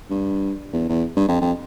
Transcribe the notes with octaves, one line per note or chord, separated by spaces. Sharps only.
G2
E2
E2
G2
F2
F2